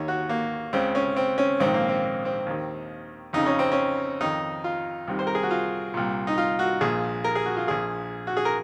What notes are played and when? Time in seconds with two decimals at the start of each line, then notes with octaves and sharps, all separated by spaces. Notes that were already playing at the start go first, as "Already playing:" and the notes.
Already playing: D#2 D#3 C#5
0.08 F#4
0.29 A#3
0.73 C#2 C#3 C4
0.95 C#4
1.17 C4
1.38 C#4
1.60 A#1 G#2 D#3 C4
1.74 A#3
1.89 C4
2.25 C4
2.47 D#2 D#3
3.33 F2 C#3 D#4
3.46 C#4
3.59 C4
3.72 C#4
4.21 F2 D#3 D#4
4.64 F4
5.08 C2 C3 D#3
5.19 C5
5.27 A#4
5.35 G#4
5.43 F#4
5.51 F4
5.94 C2 A#2
6.27 D#4
6.38 F4
6.59 F#4
6.81 A#1 A#2 G#4
7.24 A#4
7.35 G#4
7.46 F#4
7.57 F4
7.67 A#1 A#2 G#4
8.27 F#4
8.37 G#4
8.45 A#4